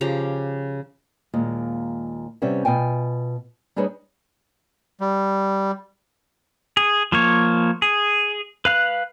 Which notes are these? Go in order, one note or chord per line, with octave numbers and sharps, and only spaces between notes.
C#3 F3 G4 A#5
D#2 A#2 G#3
C3 G3 B3 C#4 E5
B2 F4 G5 G#5
G3 D4 D#4 G#4 B4 C#5
G3
G#4
F3 A#3 C#5
G#4
B4 F5 F#6